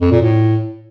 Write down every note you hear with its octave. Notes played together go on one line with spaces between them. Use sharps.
F2
A#2
A2